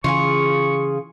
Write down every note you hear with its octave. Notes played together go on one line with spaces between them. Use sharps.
C#3 E3 F4 F#4 G#4 C#6